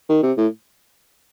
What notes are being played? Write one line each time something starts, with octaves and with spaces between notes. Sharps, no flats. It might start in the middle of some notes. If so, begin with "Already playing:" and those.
D#3
C3
A2